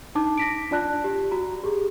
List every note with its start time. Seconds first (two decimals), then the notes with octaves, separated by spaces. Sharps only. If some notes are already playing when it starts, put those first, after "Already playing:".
0.15 D4 D#4 A5 D6
0.38 A#6 B6 D7
0.71 D4 F4 D5 A5 F#6
1.04 G4
1.31 F#4 A#5
1.64 G4 G#4